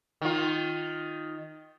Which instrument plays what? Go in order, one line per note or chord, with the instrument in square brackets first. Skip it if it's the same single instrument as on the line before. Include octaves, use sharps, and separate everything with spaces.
[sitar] D#3 F4